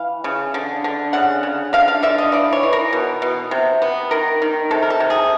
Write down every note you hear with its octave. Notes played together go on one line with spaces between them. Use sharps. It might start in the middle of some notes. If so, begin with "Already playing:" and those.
Already playing: E3 F5
C#3
D3
D3
C#3 F#5
C#3
D3 F5
F5
D3 E5
D#5
E3 D5
C#5
E3
A#4
B2
B2
C3
B3
D#3 A#4
D#3
C3 A4
A#4
A4
C3
G#4